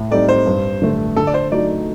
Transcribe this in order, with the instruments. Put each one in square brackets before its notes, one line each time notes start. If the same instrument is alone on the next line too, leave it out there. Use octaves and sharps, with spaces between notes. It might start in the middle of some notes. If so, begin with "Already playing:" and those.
Already playing: [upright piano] A2
[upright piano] G3 C4 D#4 A4 [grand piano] D5
[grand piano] C5
[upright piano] G2
D3 A3
[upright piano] D3 [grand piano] A4
[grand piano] D5
C5
[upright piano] F#3 A3 D#4 [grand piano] D5